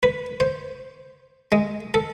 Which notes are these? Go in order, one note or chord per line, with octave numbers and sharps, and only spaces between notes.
B4
C5
G#3
A4